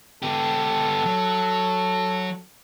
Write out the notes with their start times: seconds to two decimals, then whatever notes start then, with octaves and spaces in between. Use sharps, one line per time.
0.23 B3 G4 A4
1.05 F#3